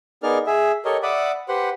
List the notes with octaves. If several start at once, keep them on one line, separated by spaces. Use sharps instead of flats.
B3 D#4 G#4 A#4 D5 F6
G#4 E5
G4 A4 A#4 C#5 D#5
D5 E5 F#5 B5 D6 D#6
G4 B4 C5 F#5